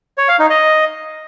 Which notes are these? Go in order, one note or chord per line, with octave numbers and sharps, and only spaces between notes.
C#5
F5
D#4
D#5